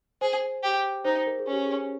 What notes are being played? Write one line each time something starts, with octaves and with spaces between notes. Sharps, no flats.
G#4 C5
G4
D#4 C5
A#4
G#4
C#4
G4
G#4